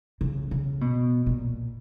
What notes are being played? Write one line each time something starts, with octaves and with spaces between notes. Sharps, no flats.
C#3
C#3
B2
A#2